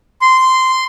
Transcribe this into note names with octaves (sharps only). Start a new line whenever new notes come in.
C6